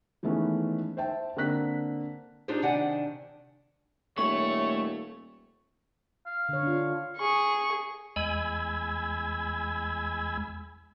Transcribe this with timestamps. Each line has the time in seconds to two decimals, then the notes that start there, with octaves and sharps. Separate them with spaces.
0.23 D#3 E3 G#3 A3 B3 C#4
0.97 C5 E5 G5 A5
1.36 D3 A#3 C4 F#6 B6
2.48 D4 D#4 F4 G4 G#4 C5
2.62 C3 D#3 D4 D5 F#5 G#5
4.18 D#1 A3 C#5 C#6
6.26 F5
6.49 D3 C#5
6.63 D4 F4
7.17 G#4 C#6
8.16 E2 G#3 G#5 B5 E6 G#6